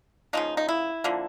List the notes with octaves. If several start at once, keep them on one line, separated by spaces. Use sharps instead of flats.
C#3 F3 A#3 D#4
D#4
E4
D3 F3 A#3